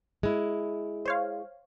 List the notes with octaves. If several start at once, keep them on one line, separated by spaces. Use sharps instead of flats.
G#3 E4
C5 C#5 F5